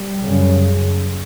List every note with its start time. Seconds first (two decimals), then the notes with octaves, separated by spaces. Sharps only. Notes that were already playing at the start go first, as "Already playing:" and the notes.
Already playing: G3
0.22 F#2 C#3